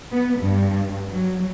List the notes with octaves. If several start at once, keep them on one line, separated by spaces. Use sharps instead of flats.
B3
G2
F#3